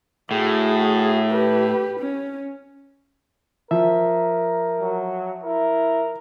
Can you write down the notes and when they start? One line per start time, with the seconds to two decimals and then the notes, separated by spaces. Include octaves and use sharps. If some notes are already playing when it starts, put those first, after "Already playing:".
0.31 A2 F#4 G#4
1.30 G4 B4
1.99 C#4
3.71 F3 A#4 E5
4.81 F#3
5.44 E4 A#4